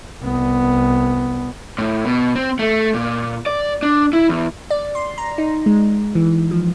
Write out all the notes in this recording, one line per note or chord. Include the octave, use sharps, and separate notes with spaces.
C2 B3
A2
B2
C4
A3
A#2
D5
D4
E4
E2
D5
C6
A#5
D#4
G#3
E3
F3